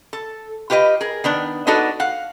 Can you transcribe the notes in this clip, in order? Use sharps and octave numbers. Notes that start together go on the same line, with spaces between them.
A4
F4 G4 B4 D5 D#5
G#4 A#4
D#3 B3 D4
B3 D4 D#4 F#4 A4
F5 F#5